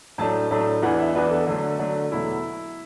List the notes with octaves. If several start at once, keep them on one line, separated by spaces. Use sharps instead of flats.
A2 F#3 A3 D4 A5
A2 F#3 A3 D4
E2 E3 B3 D4 F#5
E5
E2 E3 B3 D4 B4
A4
D3 F#3 A3 D4
D3 F#3 A3 D4
E2 B2 F#3 A3 E4